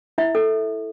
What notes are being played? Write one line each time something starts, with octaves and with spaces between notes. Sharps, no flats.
E4 E5
A4